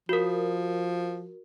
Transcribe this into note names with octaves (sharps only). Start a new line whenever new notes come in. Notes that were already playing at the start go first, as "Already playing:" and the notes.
F3 F#4 A#4